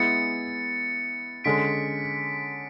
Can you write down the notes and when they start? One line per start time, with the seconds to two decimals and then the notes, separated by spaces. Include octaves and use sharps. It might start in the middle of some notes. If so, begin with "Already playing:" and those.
Already playing: G#3 B3 E4 A6 C#7
1.44 D3 G#3 C#4 B6 D7